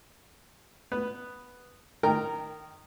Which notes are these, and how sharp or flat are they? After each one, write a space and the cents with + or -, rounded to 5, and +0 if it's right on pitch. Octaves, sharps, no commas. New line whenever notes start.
B3 +0 B4 +0
D#3 -15 A#4 -10 G5 -5